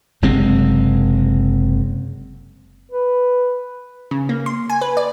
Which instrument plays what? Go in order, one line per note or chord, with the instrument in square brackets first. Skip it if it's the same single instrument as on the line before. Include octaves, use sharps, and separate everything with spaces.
[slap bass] F#1 C3 G#3 C4
[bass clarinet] B4
[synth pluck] C#3
A#3
C6
G#5
B4
D5